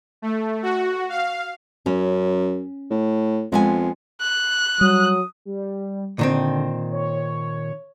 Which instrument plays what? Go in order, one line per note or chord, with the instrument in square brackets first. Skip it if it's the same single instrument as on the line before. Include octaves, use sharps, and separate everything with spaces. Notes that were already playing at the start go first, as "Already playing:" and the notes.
[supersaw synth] A3
F#4
F5
[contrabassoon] F#2 [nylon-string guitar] C#4
[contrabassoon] A2
[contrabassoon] F2 [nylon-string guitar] G#3 B3 G#5
[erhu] F#6
[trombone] F#3 [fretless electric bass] G3 [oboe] D#6
[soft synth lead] G3
[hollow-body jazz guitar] A#2 D#3 C4 [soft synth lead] D3
[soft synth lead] C#5